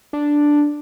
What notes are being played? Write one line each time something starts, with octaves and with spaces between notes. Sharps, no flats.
D4